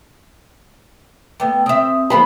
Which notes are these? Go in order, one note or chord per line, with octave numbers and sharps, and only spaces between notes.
A3 B3 G5
C4 E5 D#6
F3 B3 C4 B5